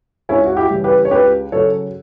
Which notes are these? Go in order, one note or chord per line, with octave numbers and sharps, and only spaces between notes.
C#2 C#4 E4
F#4
E4 G4
C#3 E3 G3
G4 B4
C#5
C#2 G4 B4
C#3 F#3 A4 C#5